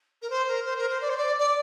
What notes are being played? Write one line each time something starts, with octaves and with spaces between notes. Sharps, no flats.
A#4
C5
A#4
C5
A#4
C5
D5
C5
D5
D5